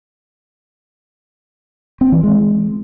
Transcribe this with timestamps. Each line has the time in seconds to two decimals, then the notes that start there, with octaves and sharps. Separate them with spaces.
2.01 C4
2.12 E3
2.23 G#3